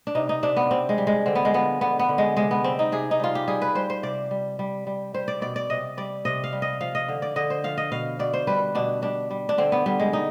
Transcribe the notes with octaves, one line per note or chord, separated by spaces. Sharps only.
D4
C3 D#4
D#4
C3 D4
B3
C3 C4
G#3
G3
G#3
D3 C4
B3
G#3
F3 B3
D3 B3
B3
D3
G#3
C3 G#3
B3
G3 C4
D#4
C3 G#4
D#4
G3 F4
G4
G3 G#4
B4
G3 C5
C5
C3 D5
G3
G3
G3
G3 C5
D5
B2 D5
D5
C3 D#5
G3 D5
C3 D#5
F5
G3
D#5
F3 F5
D#5
D3
D5
D3 D#5
C5
F3 F5
D#5
B2 F5
B2 D5
C5
G3 B4
B2 D4
G3 D4
G3
D4
D3 C4
B3
D3 G3
G#3
G3 D#4